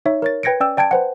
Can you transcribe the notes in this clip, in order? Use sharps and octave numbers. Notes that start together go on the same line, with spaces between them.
D#4 C#5 E5
A#4 C#5 A6
B4 G5 G#6 A#6 C#7 D7
C#4 D5 G5 E6
D5 G5 A5 G#6 D7
B4 C5 F#5